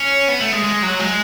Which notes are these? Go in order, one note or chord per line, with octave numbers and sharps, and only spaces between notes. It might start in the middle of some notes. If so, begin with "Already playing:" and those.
Already playing: C#4
B3
A3
G#3
G#3
F#3
G#3